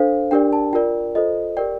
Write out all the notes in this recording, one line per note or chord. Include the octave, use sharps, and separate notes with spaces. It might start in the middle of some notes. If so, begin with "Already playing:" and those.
Already playing: D4 A4 C5 F5
D4 G4 A#4 D5 G5
A5
F4 A#4 D5 G5
F4 A4 C5 D#5
G4 A#4 D5 G5